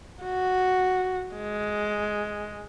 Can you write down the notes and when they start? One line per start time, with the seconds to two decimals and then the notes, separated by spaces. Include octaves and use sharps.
0.24 F#4
1.36 G#3